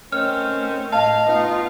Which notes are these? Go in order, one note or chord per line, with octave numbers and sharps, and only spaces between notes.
D#3 A3 C4 C#4 F6
A2 D#5 F5 A5
B3 D#4 F4 F5